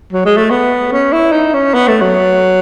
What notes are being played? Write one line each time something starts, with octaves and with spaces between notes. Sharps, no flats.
F#3
G#3
A3
B3
C#4
E4
D#4
C#4
B3
A3
F#3